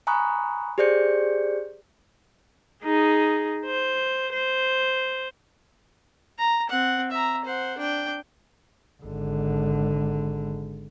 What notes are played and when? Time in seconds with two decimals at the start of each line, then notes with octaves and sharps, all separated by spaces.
0.07 G#5 A#5 B5 C#6 D#6 F#6
0.78 G4 G#4 C5 D5 G6 C#7
2.84 D#4 G#4
3.66 C5
4.33 C5
6.38 A#5
6.69 C4 F#5
7.11 E5 A#5
7.45 C5 F#5
7.78 D4 G5
9.04 G#1 D3